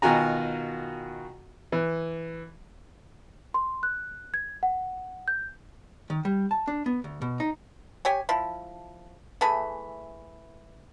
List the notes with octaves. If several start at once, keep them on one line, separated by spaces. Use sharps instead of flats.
B2 D#3 F4 F#4 G#5 A#5
E3
C6
F#6
G#6
F#5
G6
D#3
G3
A5
D4
B3
D2
B2
D#4
G4 C#5 G#5
F3 E4
E3 A3 G#4 B5